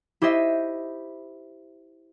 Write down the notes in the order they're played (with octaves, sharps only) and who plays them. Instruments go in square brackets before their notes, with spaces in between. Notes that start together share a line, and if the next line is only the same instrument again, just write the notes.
[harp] E4 G4 C5 D#5 E5